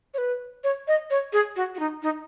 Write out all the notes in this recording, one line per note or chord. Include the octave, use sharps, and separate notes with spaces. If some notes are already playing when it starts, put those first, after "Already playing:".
C#5
B4
C#5
D#5
C#5
G#4
F#4
F#4
D#4
D#4